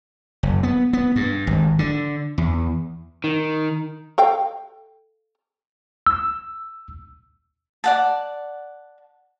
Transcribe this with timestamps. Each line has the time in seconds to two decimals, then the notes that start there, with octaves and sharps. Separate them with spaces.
0.43 F#1
0.63 B3
0.93 B3
1.16 G2
1.47 G#1
1.79 D3
2.38 E2
3.24 D#3
4.18 A4 F5 G5
6.07 E6
7.84 D5 F#5 A5